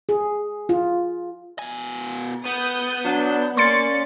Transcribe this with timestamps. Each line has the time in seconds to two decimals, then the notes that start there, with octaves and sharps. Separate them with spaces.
0.09 G#4
0.69 F4
1.59 B2 G#5
2.45 B3 D#6 G6
3.05 F#3 D4 G6
3.57 A#3 C#4 D5 C6 A6 C#7